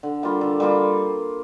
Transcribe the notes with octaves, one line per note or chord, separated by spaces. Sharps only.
D3
G3 A#3 F4
D3
G3 A#3 F4